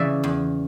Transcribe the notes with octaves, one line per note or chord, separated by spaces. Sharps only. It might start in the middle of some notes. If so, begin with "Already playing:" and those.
Already playing: C#3 E3 D5 E5
E2